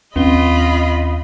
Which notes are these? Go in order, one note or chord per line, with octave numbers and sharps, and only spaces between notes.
D#2 C4 C#4 F4 D#5 B5 G7